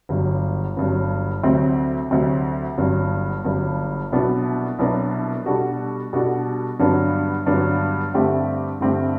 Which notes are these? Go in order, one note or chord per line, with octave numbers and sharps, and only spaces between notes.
G1 G2 F#3
G1 G2 F#3
D2 C3 F#3 C4
D2 C3 F#3 C4
G1 G2 F#3
G1 G2 F#3
C2 B2 F#3 B3 D4
C2 B2 F#3 B3 D4
B2 G3 D4 F#4 A4
B2 G3 D4 F#4 A4
G2 D3 F#3 B3 D4
G2 D3 F#3 B3 D4
G2 D3 A3 C4 G4
G2 D3 A3 C4 G4